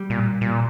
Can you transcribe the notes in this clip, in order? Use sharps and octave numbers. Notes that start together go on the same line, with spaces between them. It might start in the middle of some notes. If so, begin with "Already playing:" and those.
Already playing: G3
A#2
A#2